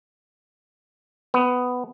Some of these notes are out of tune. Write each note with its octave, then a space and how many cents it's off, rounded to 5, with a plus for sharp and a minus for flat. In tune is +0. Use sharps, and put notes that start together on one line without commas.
B3 +10